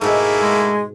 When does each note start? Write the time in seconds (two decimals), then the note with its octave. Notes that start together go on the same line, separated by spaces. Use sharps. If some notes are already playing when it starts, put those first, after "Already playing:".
0.01 G#2 B2 A3 A#3 E4 G#4 A4
0.42 G#3